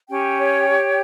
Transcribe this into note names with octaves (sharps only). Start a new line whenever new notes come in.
C#4 G4 G5
C#5
G4